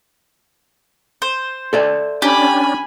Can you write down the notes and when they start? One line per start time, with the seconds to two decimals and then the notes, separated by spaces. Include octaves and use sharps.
1.22 C5
1.73 A4 D5 E5
2.22 C#4 D4 G4 G#5 B5